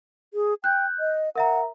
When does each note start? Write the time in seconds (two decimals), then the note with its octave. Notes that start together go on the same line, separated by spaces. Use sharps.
0.34 G#4
0.64 G5 F#6 G6
1.00 D#5
1.36 A#4 E5 F#5 A#5